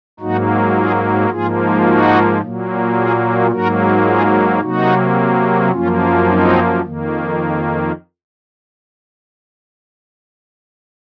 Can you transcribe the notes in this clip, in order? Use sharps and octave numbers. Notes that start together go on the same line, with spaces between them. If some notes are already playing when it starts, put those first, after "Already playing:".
G#2 F#3 A#3 D#4 F#4
F4 G#4
G#2 F3 A#3 F4 G#4
D#4 F#4
A#2 F#3 A#3
F4 G#4
G#2 F#3 A#3 F#4 A#4
F4 G#4
C3 F#3 A#3 D#4 F#4
F#2 F3 A#3 C#4 F4
C4 D#4
F2 D#3 A#3